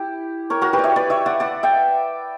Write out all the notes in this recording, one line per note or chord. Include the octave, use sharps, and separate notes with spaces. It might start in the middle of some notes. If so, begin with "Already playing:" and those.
Already playing: E4 G4
A#4 C#5
F#4 A#4
G4 B4
D5
C#5 E5
B4 D5
C#5 E5
D5 F#5
D5 F#5
E5 G5